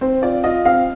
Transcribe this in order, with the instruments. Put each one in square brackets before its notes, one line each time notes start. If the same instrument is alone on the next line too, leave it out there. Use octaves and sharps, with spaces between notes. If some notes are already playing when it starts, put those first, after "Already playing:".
[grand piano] C4 [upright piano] C5
[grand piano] F4 [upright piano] D5
[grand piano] F4 [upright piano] D#5
[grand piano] C4 [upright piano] F5